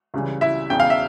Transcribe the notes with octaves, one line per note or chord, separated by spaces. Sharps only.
C#2 C#3 E3 G3
E4 E5
E1 E2 C#3 E3 G5
F5
E5